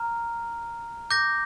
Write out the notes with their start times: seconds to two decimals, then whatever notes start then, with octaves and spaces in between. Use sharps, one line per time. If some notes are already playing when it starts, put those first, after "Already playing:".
Already playing: A#5 F6
1.11 D6 G6 A#6